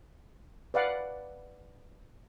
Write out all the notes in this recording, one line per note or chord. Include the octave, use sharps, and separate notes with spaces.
B4 D5 F5 F#5